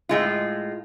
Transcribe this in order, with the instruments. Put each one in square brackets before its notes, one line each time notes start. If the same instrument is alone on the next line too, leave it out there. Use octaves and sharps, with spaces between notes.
[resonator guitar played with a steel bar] A2 G#3 F4